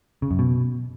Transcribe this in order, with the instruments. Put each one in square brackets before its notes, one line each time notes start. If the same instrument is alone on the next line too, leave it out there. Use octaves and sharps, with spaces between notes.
[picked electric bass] C#3
F#2
B2